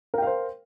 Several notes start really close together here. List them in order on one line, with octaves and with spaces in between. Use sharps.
A#4 G5 F5 C5